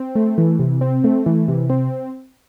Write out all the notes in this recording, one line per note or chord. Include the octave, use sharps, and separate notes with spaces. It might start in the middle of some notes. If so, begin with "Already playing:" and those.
Already playing: C4
A3
E3
C3
C4
A3
E3
C3
C4